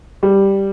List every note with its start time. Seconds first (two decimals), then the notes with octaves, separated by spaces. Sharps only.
0.23 G3